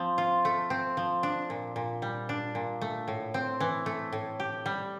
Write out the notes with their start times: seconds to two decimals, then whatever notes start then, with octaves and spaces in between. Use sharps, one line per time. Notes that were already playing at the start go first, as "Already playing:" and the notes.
Already playing: F3 C4
0.18 F4
0.45 A3
0.70 C4
0.97 F3
1.23 D4
1.50 A#2
1.76 A#2
2.02 G3
2.29 D4
2.55 A#2
2.81 A3
3.08 A2
3.34 C4
3.60 E3
3.86 A3
4.13 A2
4.40 G4
4.66 G3